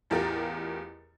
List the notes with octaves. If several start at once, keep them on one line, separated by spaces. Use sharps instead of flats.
A1 E2 F4 G4 A#4 A6